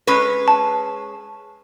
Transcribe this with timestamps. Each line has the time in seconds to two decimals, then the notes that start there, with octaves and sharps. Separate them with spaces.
0.07 G#3 C#4 B4
0.48 A5